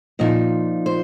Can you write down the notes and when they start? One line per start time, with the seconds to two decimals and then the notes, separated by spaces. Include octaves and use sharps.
0.19 A#2 F3 D#4 D#5
0.86 C5